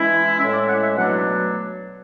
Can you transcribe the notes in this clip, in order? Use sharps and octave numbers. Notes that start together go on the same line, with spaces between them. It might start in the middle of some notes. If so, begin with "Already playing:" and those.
Already playing: E3 G#3 C#4 E4
A2 G#3 C#4 E5
D5
F#5
E5
B2 F#3 A3 D4 F#5